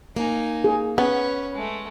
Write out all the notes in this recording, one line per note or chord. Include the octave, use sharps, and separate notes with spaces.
A#3 D#4 G#5
G#4
B3 C#4 B4 C#5
G#3 A3